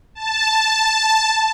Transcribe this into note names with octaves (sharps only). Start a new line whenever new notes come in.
A5